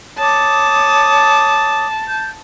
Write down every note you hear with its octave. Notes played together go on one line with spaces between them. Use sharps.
C#5 A5 D6 D#6
G6